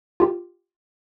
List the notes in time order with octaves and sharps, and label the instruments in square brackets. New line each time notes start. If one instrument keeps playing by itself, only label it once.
[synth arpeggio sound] F4 G4